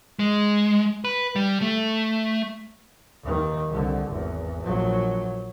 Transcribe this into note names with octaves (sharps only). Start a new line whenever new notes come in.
G#3
B4
G3
A3
D#2 D#3
C2 D3
G#1 E2
A#1 F#3